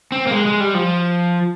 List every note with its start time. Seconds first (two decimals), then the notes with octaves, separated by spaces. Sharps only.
0.12 C4
0.27 A#3
0.31 G#3
0.46 G#3
0.60 G3
0.74 F3